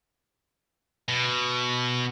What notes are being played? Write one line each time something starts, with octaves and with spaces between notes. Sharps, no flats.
B2